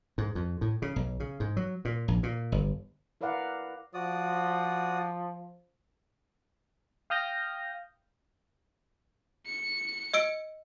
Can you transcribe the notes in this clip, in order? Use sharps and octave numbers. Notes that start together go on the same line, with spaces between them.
G#2
F2
A2
C#3
B1
C#3
G#2
F#3
A#2
A#1
A#2
G1
E4 A#4 B4 D5 F5 F#5
F3 F#4 D5 D#6
F5 G5 D#6 F6 G6 A#6
C#7
D#5 E6 D7